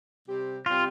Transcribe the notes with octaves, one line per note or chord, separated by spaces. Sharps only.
C3 G3 C4 G4
C3 G3 C4 F4 G4